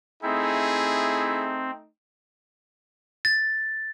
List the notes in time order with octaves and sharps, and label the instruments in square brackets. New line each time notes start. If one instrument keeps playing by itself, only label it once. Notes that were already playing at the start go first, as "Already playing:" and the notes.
[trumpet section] A3 D#4 [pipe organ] C4 [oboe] E4 [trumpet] G#4
[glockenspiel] A6